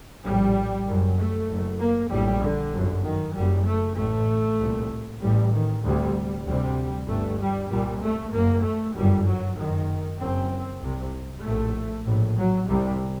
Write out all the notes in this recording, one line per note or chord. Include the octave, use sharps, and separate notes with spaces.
A#1 A2 G3
F#1 F#2
A3
F#1 F#2
A#3
A#1 A2 G3
D3
G1 F#2
D#3
F#1 F#2 G3
A3
A1 A2 A3
C2 A#2
A1 A2 G3
D#3
D2 C3 G3
D2 C3 G3
G1 G2 A3
G3
C2 A#2 G3
A3
F#1 F#2 A#3
A3
G1 F#2 G3
F#3
F#1 F#2 D#3
F#1 F#2 C4
C2 C3
A#1 A2 A3
A#1 A2
F#3
C2 C3 G3